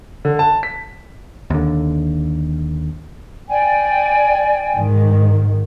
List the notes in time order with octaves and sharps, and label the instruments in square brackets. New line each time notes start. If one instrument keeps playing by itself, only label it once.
[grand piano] D3
A5
B6
[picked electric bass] D#2 D3
[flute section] D5 G5 G#5
[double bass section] G#2 D#3